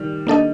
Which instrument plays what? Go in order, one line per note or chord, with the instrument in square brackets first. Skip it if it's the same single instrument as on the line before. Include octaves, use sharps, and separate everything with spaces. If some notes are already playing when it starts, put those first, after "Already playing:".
Already playing: [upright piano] D#3 G3
[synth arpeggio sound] A#3 D4 A4 D#5